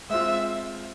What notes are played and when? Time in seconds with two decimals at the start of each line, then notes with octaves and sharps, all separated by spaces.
0.10 G#3 C4 F4 E5